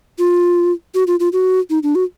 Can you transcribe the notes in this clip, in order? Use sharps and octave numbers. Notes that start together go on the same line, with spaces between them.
F4
F#4
F4
F4
F#4
D#4
D4
F#4